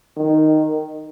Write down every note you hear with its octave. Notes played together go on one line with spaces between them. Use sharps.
D#3